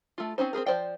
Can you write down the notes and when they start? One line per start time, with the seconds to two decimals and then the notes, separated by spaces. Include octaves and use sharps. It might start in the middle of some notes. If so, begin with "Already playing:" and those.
0.18 A3 F4
0.38 C4 C#4 D#4 C5
0.53 C4 D#4 G#4 A#4
0.66 F3 F#3 C5 D5 G5